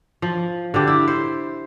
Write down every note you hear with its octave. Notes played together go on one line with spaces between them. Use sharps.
F3
D3 G4
E4
C5